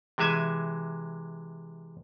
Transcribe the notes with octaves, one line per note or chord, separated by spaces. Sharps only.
C3 E3 G#3 E5 G#5